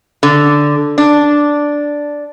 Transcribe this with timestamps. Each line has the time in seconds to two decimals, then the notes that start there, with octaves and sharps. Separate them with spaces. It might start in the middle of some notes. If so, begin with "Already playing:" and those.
0.23 D3
0.98 D4